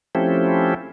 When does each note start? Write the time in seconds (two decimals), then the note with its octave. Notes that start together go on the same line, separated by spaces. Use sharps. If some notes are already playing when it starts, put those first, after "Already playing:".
0.15 F3 A3 C4 C#4 E4 G4